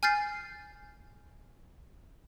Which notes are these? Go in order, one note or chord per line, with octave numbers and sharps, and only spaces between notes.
G#5 F6 G6 A6 C7